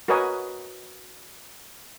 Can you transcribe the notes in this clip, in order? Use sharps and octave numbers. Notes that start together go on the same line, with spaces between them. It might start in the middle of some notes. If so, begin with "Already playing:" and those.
F#4 A#4 B4 C#5 D#5 G#5